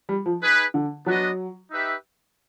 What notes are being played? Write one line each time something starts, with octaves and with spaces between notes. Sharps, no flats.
G3
F3
D#4 G#4 B4
D3
F#3 B3 D4 F#4 B4 D#5
D#4 G4 B4 E5